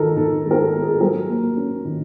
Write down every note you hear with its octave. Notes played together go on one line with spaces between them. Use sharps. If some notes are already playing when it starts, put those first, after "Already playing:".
Already playing: D#3 G#3 A4 A#4
D#3 A4
G#3
A#4
A4
B3
G#4
A4
F#3 A#4
A#3
C#4
D#3